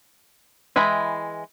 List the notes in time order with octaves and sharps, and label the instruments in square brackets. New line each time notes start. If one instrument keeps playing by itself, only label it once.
[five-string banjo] E3 G#3 E4 G5 B5